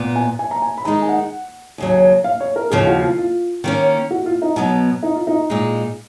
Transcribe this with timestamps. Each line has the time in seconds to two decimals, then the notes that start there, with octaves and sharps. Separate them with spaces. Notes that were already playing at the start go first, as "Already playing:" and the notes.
Already playing: A#2 B3
0.16 G#5
0.39 G#5
0.51 A#5
0.62 G#5
0.78 B5
0.85 D#3 G#3 D#4 A#5
1.02 G#5
1.09 F#5
1.78 D#2 C#3 F#3
2.24 F5
2.41 C#5
2.56 A#4
2.70 D#2 C#3 F3 G#4
2.87 F#4
3.03 F4
3.18 F4
3.64 D#3 A#3 C#4
4.11 F#4
4.26 F4
4.42 D#4
4.56 B2 F#3 B3
5.03 D#4
5.15 F4
5.27 D#4
5.50 A#2 G#3 D#4